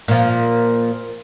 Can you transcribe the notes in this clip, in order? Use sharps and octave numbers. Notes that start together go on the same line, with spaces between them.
A#2 F3